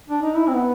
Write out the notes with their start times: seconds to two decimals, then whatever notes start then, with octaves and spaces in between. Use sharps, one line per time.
0.10 D4
0.22 D#4
0.36 E4
0.47 C4
0.54 B3